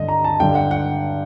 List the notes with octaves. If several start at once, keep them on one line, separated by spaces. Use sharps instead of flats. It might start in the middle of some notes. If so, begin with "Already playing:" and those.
Already playing: G2 D3 D#5
A#5
A5
G2 D3 G5
F#5
F#5